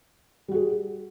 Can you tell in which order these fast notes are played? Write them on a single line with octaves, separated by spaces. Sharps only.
G3 F#4 G#4